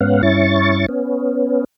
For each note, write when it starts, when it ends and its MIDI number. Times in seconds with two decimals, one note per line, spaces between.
0.01 0.22 44
0.01 0.22 59
0.01 0.22 61
0.01 0.22 77
0.01 0.22 78
0.23 0.86 43
0.23 0.86 61
0.23 0.86 64
0.23 0.86 85
0.23 0.86 93
0.89 1.64 59
0.89 1.64 61